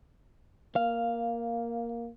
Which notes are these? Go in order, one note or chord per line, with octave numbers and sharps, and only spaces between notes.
A#3 F5